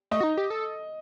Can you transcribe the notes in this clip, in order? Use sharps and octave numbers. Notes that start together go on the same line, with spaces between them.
A3 D#5
F#4
D#4
G4
A4